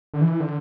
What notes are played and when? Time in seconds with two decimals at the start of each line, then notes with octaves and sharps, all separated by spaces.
0.14 D3
0.21 E3
0.40 D3